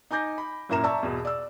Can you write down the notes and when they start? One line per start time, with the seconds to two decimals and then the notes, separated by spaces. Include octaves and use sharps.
0.11 D#4 G#5 D6 G6 A#6
0.38 B5
0.69 F#2 A#2 E4 A#4 A#5 E7
0.84 D5 E5 A5 A#5 C#6 E6
1.03 E2 B2
1.25 D5 E6